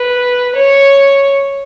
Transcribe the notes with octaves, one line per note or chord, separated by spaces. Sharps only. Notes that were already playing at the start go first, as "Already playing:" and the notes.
Already playing: B4
C#5